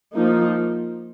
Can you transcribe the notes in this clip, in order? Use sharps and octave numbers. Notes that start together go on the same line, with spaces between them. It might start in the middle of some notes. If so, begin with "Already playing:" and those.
F3 A#3 D#4